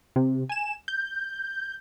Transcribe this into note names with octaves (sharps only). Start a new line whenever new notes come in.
C3
G#5 E7
G6